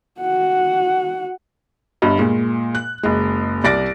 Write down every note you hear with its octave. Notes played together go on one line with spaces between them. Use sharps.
F#4 F#5
G1 G2 D#5
A#2 G#3
F#6
F#1 G#3
C2 D5 A6 A#6 D7